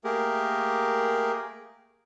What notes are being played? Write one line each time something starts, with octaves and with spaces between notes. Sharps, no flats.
A3 A#3 G4 G#4 A#4